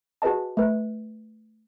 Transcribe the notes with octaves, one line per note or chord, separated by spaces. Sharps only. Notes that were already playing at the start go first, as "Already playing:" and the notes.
F#4 G#4 B4 D#5 A5
A3 B4